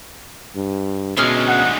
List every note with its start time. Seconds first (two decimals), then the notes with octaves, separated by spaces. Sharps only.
0.56 G2
1.17 D2 B2 G#3 C#4 G#4 F6
1.48 F#5